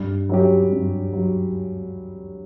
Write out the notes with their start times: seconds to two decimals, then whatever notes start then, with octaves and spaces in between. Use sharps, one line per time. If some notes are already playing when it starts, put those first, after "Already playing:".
Already playing: G2
0.29 F#3 C#4 G4
0.72 G2
1.13 F#3